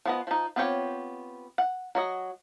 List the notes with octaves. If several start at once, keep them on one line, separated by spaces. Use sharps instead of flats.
F3 B3 D#5
F3 D#4
B3 C4 F4 G4 C#5
F#5
F#3 F#4 D#5